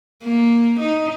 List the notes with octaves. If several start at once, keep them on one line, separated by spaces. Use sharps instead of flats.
A#3
D#4